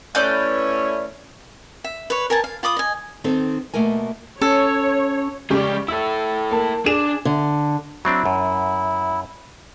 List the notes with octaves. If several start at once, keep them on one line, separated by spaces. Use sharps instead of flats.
A3 C#4 E4 B4 D5 G6
E5
B4 C#5
A#4 G#5 A5
F5
F4 B5 D6 D#6
D#5 G#5
D#3 C4 D#4 A4 C5
B2 A3 A#3 A#4 G#5
C#4 A4 C#5
C#3 G#3 G4 D5 C#6
E4 A4 E6
A#3 A5
D4 G#4 E7
D3
F#3 C4 D4 E4
F#2